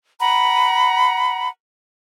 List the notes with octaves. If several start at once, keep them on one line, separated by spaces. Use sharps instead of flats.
F#5 A#5 B5